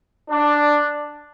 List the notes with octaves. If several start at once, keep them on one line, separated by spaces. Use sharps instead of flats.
D4